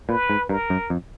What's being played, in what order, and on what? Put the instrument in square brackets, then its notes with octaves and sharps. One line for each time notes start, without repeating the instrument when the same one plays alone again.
[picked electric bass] A#2 [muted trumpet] B4
[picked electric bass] G#2
[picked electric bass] G2 [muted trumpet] A#4
[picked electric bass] F#2
F2